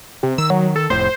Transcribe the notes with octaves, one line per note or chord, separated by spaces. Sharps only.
C3
D#3 E6
F#3
A4
F1 A2 C5